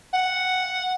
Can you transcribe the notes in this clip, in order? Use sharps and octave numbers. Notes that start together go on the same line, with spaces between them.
F#5